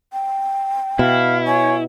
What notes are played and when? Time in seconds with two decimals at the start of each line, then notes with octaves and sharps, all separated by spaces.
0.13 G5
0.99 B2 E4 F5
1.47 C#5 G#5